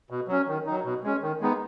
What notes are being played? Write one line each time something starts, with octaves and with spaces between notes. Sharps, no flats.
B2
F#3 C#4
D#3
F#3 D#4
B2
G#3 C#4
D#3
G#3 B3 D#4